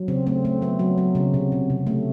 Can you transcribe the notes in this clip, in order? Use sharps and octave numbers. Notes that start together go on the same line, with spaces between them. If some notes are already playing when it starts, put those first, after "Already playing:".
Already playing: F#3
C#3 C4
A3 C4
A3 C4
F#3 B3
F#3
F#3
C#3
C3
C3
C3
A3